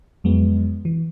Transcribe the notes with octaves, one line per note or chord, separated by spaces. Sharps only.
F2 F#3 G#3 B3
E3